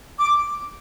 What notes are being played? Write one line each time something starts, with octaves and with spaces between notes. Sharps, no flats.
D6